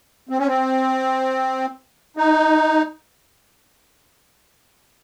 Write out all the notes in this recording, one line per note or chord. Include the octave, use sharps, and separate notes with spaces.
C4
C#4
C4
D#4